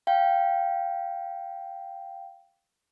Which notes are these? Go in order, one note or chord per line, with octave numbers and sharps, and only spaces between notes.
F5 G5